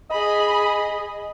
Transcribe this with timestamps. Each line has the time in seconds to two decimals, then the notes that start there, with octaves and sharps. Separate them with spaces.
0.11 G#4 D#5 B5